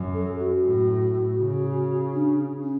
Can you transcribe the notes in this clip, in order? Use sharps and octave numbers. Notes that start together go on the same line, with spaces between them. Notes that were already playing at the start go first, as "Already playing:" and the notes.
Already playing: F#2
A4
F#4
A2
C#3
D4
C#4